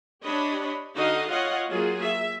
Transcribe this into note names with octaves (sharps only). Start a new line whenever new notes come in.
D4 G4 C#5 D#5 B5
D3 D#4 F#4 D#5 F5
F4 C#5 D#5 F5 F#5
F#3 A#3 F4 G#4
E5